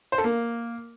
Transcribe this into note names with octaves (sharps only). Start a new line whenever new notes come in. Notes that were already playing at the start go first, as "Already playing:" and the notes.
C5
A4
A#3